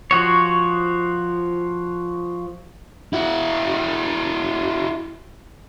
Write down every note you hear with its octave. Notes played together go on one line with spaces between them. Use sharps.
F3 F#4 C#5
E4 F#4